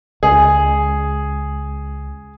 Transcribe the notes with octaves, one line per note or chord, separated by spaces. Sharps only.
C#2 G#4